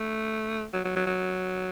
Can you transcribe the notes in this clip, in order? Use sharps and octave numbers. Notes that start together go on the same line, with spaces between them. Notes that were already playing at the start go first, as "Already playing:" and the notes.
Already playing: A3
F#3
F#3
F#3
F#3